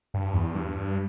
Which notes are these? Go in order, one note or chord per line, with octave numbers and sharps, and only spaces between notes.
G2
E2
G2